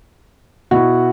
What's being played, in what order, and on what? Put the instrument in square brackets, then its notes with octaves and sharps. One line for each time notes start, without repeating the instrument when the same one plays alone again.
[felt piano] B2 B3 E4 F#4